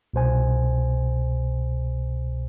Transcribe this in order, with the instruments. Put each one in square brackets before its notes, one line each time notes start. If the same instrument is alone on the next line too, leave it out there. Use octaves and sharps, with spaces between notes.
[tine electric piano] C2 B2 C5 G#5